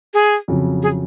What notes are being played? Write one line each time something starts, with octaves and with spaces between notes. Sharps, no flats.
G#4
F2 C#3 F#3
G#4